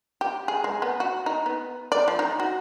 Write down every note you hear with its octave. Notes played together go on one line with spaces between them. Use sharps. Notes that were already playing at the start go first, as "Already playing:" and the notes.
G4
G#4
G#3
B3
F#4
D#4
B3
D5
F3
D#4
F#4